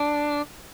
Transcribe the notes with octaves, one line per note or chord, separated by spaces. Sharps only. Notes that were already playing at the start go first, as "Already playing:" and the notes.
Already playing: D4